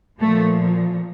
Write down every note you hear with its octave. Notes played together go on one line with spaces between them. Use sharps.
A#2 F3 A3